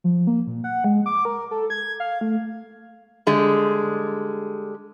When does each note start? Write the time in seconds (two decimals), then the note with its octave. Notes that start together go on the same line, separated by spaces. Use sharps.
0.04 F3
0.27 A#3
0.47 A#2
0.64 F#5
0.84 G#3
1.06 D6
1.25 A#4
1.51 A4
1.70 G#6
2.00 F5
2.21 A3
3.27 D3 G3 G#3